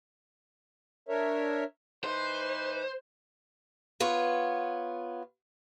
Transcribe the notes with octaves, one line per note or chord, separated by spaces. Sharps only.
D4 A#4 C#5 E5
E3 D#4 B4 C5
B3 F4 C#5